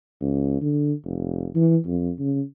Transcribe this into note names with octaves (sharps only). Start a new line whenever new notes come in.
C#2
D3
F1
E3
F2
C#3